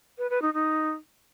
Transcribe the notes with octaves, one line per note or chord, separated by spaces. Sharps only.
B4
B4
D#4
D#4